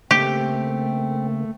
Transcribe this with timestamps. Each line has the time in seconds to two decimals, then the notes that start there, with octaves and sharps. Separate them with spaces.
0.11 C#3 A3 A#3 C4 G4